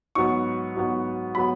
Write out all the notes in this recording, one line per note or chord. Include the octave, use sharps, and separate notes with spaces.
G#2 F#3 B3 C#6
G#2 F#3 B3
F#3 B3 B5